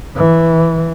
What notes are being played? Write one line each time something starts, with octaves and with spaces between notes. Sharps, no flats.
E3